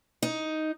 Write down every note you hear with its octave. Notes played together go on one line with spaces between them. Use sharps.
D#4